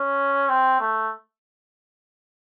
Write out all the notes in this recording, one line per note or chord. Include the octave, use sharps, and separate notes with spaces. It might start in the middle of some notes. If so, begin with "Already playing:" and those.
Already playing: C#4
C4
A3